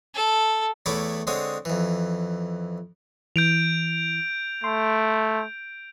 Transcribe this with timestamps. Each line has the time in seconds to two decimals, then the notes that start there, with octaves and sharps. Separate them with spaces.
0.14 A4
0.86 E2 A3 E4 C#5 B5 D6
1.27 D3 G#3 C4 C#5 D#6
1.65 F2 E3
3.36 E3 G6 D7 F7
4.64 A3 C6